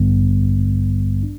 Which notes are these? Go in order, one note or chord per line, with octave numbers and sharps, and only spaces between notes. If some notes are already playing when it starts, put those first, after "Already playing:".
Already playing: A1 G2 D3 G3 B3
D4